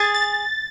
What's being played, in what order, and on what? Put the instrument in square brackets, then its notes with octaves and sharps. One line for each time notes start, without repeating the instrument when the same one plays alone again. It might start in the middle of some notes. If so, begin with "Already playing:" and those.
Already playing: [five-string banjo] G#4 [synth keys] A6
[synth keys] A6